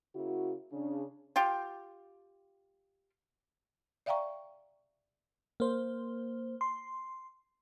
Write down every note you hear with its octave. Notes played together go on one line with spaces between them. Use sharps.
C#3 A#3 E4 F#4
C#3 D4
F4 G4
D5 E5 F5 G5 A#5 C#6
A#3 C5
C6